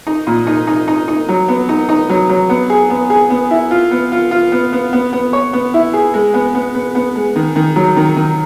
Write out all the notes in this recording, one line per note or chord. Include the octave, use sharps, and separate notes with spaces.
D#4
A#2
D#4
D#4
D#4
D#4
F#3
B3
D#4
D#4
F#3
F#3
B3
G#4
B3
G#4
B3
E4
F4
B3
F4
F4
B3
B3
B3
B3
C#5
B3
E4
G#4
G#3
B3
B3
B3
B3
G#3
D#3
D#3
F#3
D#3
D#3